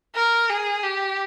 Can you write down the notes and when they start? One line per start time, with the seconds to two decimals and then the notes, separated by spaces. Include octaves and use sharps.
0.15 A#4
0.50 G#4
0.84 G4